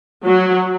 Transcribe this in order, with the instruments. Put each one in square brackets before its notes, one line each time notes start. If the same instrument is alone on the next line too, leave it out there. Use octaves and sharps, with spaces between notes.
[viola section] F#3